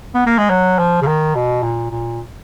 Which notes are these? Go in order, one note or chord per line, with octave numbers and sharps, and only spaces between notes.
B3
A#3
G#3
F#3
F3
C#3
D#3
B2
A#2
A#2